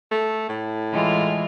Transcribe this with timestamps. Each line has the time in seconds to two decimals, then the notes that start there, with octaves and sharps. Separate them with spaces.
0.11 A3
0.49 A2
0.92 E3 G#3 F4